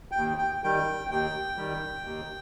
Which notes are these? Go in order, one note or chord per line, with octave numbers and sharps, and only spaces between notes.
G5
D#2
G5
D#3 G3 G5
D#2 G5
D#3 G3
D#2